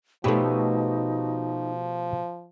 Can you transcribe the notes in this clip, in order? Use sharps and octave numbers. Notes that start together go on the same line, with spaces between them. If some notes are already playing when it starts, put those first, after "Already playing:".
B2 F3 A3 D#4 G4 B4 C#5